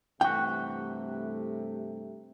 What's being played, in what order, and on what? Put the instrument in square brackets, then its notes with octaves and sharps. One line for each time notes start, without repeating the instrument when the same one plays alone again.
[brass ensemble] G2 C3 A3 [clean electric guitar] E3 F#4 [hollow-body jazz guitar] G5